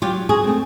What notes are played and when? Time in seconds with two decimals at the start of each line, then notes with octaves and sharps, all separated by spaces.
0.02 F#3 F4 G4
0.29 F#4 G#4
0.44 A3 C4